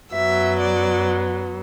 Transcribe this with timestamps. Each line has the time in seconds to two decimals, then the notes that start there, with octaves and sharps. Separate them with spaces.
0.13 F#2 F#3 B3 E5
0.61 D5